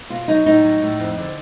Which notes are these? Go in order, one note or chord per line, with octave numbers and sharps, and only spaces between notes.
B2 F4
F#3 D#4
A2 D#4
F#3
A2
F2
D3